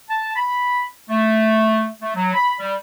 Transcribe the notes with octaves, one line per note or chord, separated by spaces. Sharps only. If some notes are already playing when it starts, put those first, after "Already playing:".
A5
B5
A3
A3
F#3
B5
G3